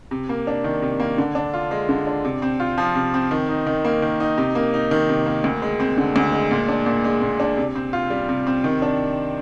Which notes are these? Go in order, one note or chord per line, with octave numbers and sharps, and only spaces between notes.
C3
A#3
D4
D#3
C3
A#3
D3
D4
F4
G#3
D3
D4
C3
C4
F4
F3
C3
C4
D#3
D#4
D#3
A#3
D#3
D#4
C3
A#3
D#4
D#3
C3
A#3
D2
G#3
C4
D3
D2
G#3
A#2
D4
A#2
G#3
A#2
D4
C3
C4
F4
G3
C3
C4
D#3
D4